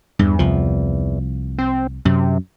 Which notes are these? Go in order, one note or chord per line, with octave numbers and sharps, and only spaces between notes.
E2 G2
C2 F3
C4
F#2 C3